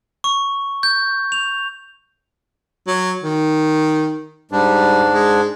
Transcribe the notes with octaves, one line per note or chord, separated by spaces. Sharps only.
C#6
G6
F7
F#3
D#3
G#2 G3 D4
G#3